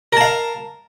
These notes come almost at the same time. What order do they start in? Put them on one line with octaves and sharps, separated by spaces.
A#4 A5 F5